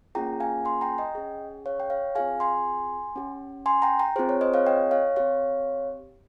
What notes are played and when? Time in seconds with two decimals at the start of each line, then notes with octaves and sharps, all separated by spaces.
0.15 A#3 C#4 F4 G#4 G5 A#5
0.40 F5 G#5
0.65 G#5 C6
0.81 G5 A#5
0.98 D#5 G5
1.15 C#4 G#4
1.66 C#5 F5
1.80 G5
1.90 C#5 F5
2.15 C4 F4 G#4 F5 G#5
2.40 G#5 C6
3.16 C#4 G4
3.66 G#5 C6
3.82 G5 A#5
3.99 G5 A#5
4.16 C4 F4 G#4 C5
4.29 C#5
4.41 C5 D#5
4.54 C#5 F5
4.66 D#5 G5
4.91 C#5 F5
5.16 C4 G4 C#5 F5